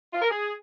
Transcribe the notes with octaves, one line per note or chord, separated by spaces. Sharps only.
F4
A#4
G#4